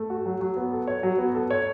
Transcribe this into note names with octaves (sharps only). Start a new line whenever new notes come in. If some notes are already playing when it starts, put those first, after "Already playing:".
Already playing: A3
F#4
F#3
F#3
B3
A4
C#5
F#3
B3
A4
C#5